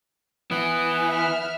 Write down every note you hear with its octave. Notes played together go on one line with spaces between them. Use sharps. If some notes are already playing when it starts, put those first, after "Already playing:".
E3 B3
E5 F6